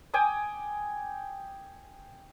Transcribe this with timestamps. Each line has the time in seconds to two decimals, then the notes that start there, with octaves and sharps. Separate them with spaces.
0.14 G5 G#5 D6 D#6